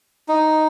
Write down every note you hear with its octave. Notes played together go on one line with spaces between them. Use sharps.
D#4